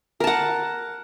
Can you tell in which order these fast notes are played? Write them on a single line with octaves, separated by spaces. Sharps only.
A#4 A5 F#5